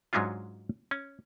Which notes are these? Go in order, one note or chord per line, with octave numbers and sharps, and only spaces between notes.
G#2 F#3 G#3 C#4 D4 F4
C#4